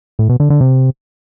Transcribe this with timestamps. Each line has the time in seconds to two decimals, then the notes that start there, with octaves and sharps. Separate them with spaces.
0.19 A2
0.29 B2
0.40 D3
0.50 D3
0.61 C3